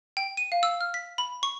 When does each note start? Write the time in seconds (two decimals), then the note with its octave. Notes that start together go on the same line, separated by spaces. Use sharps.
0.17 G5
0.37 D#7
0.52 F5
0.63 E6
0.81 F6
0.94 B6
1.18 B5
1.43 C#6